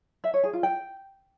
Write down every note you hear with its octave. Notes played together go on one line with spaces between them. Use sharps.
E5
C#5
G#4
F4
G5